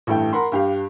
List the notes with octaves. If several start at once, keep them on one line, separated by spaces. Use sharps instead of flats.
A1 G2 E3 A3 G5
A#4 F#5 B5 C6
G2 G4 F5